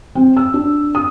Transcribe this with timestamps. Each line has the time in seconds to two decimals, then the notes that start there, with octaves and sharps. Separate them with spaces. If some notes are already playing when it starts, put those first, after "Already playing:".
0.15 C4
0.37 E6
0.54 D4
0.95 D#6